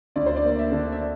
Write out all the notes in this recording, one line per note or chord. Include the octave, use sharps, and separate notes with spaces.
D2 D5
C5
D5
A#3
E5
D3
E5